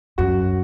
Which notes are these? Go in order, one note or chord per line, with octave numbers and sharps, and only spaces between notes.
F#2 F#4